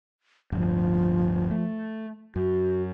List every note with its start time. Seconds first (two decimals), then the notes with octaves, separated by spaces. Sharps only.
0.52 D1 G2 F3
1.51 A3
2.36 F#2 F#4